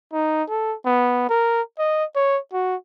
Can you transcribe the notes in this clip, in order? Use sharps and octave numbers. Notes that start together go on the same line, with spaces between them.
D#4
A4
B3
A#4
D#5
C#5
F#4